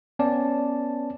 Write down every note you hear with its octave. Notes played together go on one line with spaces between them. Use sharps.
B3 C#4 D5 A5